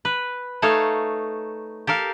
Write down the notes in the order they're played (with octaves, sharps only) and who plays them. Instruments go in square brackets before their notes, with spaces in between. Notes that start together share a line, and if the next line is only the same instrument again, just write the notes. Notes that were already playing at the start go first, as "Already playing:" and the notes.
[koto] B4
A3 D#4 A4 C#5 F5
G4 A4 A#4 F5